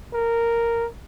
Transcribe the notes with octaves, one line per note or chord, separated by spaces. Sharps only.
A#4